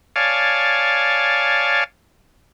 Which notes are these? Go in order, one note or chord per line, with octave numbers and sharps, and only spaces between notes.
C#5 D5 F5 G#5 A5